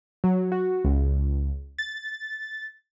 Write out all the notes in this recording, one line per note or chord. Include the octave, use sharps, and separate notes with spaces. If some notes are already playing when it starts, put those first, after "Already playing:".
F#3
F#4
C#2
A6